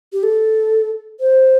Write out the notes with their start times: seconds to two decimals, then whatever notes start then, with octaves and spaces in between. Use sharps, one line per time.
0.13 G4
0.23 A4
1.20 C5